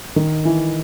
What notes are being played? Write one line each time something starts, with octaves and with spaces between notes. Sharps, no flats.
D#3
E3